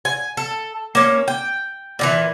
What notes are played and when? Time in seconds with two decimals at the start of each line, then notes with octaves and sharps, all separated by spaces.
0.05 G#5
0.37 A4
0.95 A#3 C#4
1.28 G5
1.99 A#2 D#3 E3